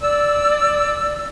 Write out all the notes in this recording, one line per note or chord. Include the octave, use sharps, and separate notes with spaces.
D5 E6